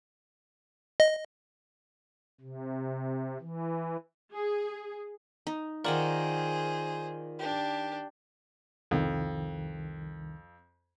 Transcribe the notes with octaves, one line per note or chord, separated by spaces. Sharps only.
D#5
C3
E3
G#4
D#4
D#3 F4 G#4 A#4 C5 D5 F#5 C#6
D4 G4
C2 F2 D#3